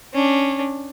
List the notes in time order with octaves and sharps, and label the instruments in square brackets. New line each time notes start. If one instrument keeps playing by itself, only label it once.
[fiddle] C#4 D4